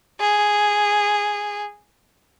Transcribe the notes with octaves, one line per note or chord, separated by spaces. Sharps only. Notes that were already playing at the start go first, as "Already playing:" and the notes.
G#4